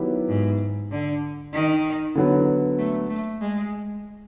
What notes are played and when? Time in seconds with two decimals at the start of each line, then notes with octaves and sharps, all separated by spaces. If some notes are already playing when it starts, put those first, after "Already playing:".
Already playing: D#3 F#3 B3 E4 G4
0.28 G#2
0.91 D3
1.53 D#3
2.15 D3 F#3 B3
2.78 A3
3.09 A3
3.40 G#3